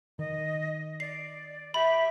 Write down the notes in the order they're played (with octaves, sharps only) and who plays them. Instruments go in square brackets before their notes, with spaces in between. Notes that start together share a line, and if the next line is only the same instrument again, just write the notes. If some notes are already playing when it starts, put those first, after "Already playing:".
[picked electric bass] D#3 [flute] D#5
[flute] D5 [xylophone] C7
[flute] G4 [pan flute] E5 [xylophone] B5